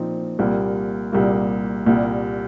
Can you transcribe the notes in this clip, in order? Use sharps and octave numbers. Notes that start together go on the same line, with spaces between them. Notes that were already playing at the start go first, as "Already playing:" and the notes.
Already playing: A#2 F3 C4 D#4
C2 A#2 G3 A#3
C2 A#2 G3 A#3
C2 A#2 G3